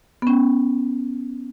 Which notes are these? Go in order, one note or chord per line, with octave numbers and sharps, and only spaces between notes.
B3
C#4